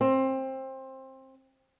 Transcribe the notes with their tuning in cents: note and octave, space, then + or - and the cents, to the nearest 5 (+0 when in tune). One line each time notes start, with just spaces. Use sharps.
C4 +20